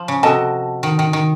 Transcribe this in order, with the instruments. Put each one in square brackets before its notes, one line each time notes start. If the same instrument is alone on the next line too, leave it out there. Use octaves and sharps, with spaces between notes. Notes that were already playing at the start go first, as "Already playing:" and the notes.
Already playing: [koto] F3
C#3
[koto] C3 [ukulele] F#4 A4 D#5 A5
[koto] D#3
D#3
D#3